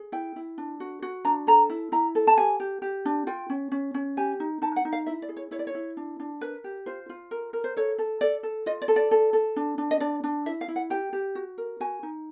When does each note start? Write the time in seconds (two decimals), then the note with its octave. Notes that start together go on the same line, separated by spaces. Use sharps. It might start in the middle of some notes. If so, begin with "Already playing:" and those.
Already playing: G#4
0.12 E4 G5
0.36 E4
0.58 D4
0.80 F#4
1.02 F#4
1.25 D4 A#5
1.47 A4 A#5
1.70 E4
1.92 E4 A#5
2.15 A4
2.27 A5
2.38 G4 G#5
2.60 G4
2.82 G4
3.05 D4
3.27 F4 G5
3.50 C#4
3.72 C#4
3.94 C#4
4.17 G4 G#5
4.40 D#4
4.62 D#4 A5
4.76 F#5
4.85 D#4
4.93 F5
5.06 E4 E5
5.22 D5
5.29 G#4
5.37 C#5
5.51 E4 C#5
5.59 D5
5.67 C#5
5.75 E4
5.97 D4
6.20 D4
6.41 A#4 B4
6.64 G4
6.86 F4 C5
7.10 F4
7.31 A#4
7.53 A#4
7.64 C5
7.77 A4 C#5
7.99 A4
8.21 A4 D5
8.43 A4
8.66 F4 D#5
8.82 D5
8.88 A4
8.96 D5
9.11 A4
9.33 A4
9.56 D4
9.78 D4
9.91 D#5
10.00 D4 D5
10.24 D4
10.46 E4 E5
10.61 F5
10.68 E4
10.76 F#5
10.90 G4 G5
11.13 G4
11.35 F#4
11.58 A#4
11.80 F#4 G#5
12.03 D#4